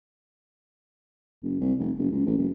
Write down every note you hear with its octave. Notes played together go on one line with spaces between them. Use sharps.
F#1
C2
F1
F#1
C#2
A1
F#1